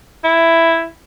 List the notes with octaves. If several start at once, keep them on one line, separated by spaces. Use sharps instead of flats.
E4